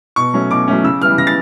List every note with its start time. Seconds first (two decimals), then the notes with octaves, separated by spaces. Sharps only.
0.16 B2 C#6
0.34 F#3 A3 C#4
0.51 B2 D6
0.67 F#3 A3 C#4
0.84 C#3 E6
1.01 E3 G3 B3 F6
1.18 C#3 A#6
1.27 A6